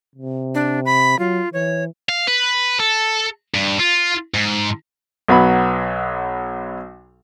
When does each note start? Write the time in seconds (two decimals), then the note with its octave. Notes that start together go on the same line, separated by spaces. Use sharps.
0.16 C3
0.55 D4
0.86 B5
1.19 F#3 F4
1.53 E3 C#5
2.09 F5
2.27 B4
2.80 A4
3.54 G2
3.80 F4
4.34 G#2
5.28 B1 F#3 B3 B5